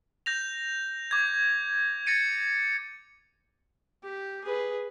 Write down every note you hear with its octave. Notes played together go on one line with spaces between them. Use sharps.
G6 A#6 F7
D6 G#6
A6 A#6 C#7 D#7
G4
G#4 B4